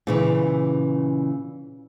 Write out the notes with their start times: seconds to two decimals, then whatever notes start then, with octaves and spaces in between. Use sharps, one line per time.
0.07 A#2 C#3 E3